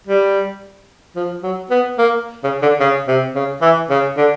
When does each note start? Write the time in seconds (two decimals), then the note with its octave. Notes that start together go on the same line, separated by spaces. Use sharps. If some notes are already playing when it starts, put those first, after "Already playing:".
0.07 G3
1.16 F3
1.43 F#3
1.71 B3
1.98 A#3
2.44 C#3
2.62 D3
2.80 C#3
3.08 C3
3.36 C#3
3.62 E3
3.90 C#3
4.17 D3